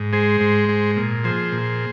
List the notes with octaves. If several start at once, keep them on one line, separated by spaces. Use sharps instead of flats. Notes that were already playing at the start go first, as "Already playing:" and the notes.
Already playing: G#2
G#3 G#4 C5
G#2
G#3
A#2
F3 G#4 C5
A#2